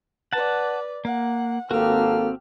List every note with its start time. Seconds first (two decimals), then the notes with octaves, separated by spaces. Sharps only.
0.33 B4 D5 F#5 A5
1.05 A#3 F#5
1.71 G#1 A#3 C4 F#4 G4 A4 F6